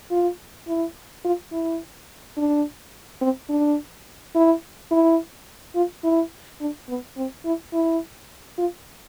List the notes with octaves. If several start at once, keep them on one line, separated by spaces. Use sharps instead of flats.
F4
E4
F4
E4
D4
C4
D4
E4
E4
F4
E4
D4
B3
C4
E4
E4
F4